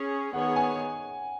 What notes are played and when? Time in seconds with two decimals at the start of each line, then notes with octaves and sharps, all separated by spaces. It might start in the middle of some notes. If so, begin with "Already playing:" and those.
Already playing: C#4 G#4 C#5
0.33 D#3 B3 G#4 C#5 F#5
0.56 G#5